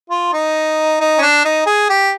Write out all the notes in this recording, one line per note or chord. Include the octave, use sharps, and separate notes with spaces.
F4
D#4
D#4
C#4
D4
D#4
G#4
G4